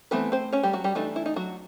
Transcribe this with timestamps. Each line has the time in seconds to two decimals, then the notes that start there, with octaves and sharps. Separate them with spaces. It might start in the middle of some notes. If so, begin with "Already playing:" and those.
0.11 E3 A3 B3 C4 B4
0.32 C4 C5
0.52 C#4 C#5
0.63 G3 G4
0.73 F#3 F#4
0.84 G3 G4
0.95 E3 A3 D4 D#4
1.16 E4
1.26 D#4
1.36 F#3 F#4